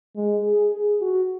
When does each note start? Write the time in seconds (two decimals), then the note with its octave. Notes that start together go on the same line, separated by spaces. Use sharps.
0.16 G#3
0.44 G#4
0.73 G#4
1.01 F#4